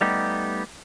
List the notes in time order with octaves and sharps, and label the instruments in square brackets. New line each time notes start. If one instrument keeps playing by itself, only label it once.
[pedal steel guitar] G3 A3 B3 D#4 G4